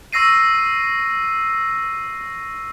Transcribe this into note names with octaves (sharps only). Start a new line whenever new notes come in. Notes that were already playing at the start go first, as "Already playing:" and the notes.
C#6 E6 A#6 C7 D#7